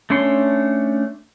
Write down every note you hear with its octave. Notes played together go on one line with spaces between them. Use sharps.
A3 C#4 D4 C#5 C6